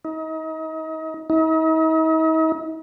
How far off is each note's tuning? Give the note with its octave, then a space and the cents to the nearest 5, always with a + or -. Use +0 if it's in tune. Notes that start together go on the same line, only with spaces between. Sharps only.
D#4 +35
D#4 +45